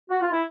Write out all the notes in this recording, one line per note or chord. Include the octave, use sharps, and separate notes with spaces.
F#4
F4
E4